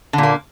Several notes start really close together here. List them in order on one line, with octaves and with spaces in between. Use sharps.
D3 A#2 A#3